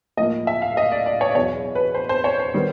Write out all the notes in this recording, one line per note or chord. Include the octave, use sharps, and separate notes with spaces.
A2 F3 A#3 D#5
E5
F5
D#5
D5
D5
C#5
D5
E2 B2 F#3 C#5
B4
C5
C5
C#5
C5
D#3 G3 B3